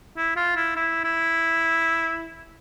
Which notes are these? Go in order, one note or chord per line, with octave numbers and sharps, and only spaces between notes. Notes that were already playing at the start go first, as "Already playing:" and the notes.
E4
F4
E4
E4
E4